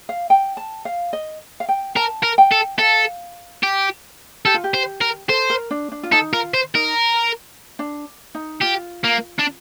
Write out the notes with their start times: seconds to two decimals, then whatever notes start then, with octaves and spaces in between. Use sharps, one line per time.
0.09 F5
0.30 G5
0.57 A5
0.85 F5
1.13 D#5
1.60 F5
1.69 G5
1.96 A#4 A5
2.23 A#4
2.38 G5
2.52 A4
2.79 A4 F5
3.63 G4
4.45 G4 A4
4.54 F4
4.64 G4
4.74 C5
5.01 A#4
5.28 A4 C5
5.50 A#4
5.71 D4
5.92 D4
6.03 F4
6.12 D#4 A4
6.33 F4 A#4
6.54 C5
6.75 D#4 A#4
7.79 D4
8.35 D#4
8.62 F4 G4
9.04 A#3
9.39 D4